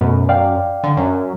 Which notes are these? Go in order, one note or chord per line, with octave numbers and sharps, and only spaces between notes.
F#2 B2 A3 B4
D5 F5 G5
D3
F#2